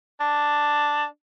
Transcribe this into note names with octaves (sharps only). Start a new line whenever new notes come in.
D4